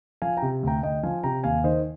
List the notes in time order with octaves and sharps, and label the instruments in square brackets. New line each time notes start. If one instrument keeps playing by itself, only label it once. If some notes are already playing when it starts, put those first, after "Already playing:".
[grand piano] F3 F5 G#5
G5 A#5
C3
D2 G5 A#5
D2 D#5 G5
F3 F5 G#5
C3 G5 A#5
D#2 F5 G#5
D#3 C5 D#5